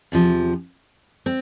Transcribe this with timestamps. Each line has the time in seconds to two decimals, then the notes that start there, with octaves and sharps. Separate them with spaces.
0.12 E2 C3 F3
1.26 C4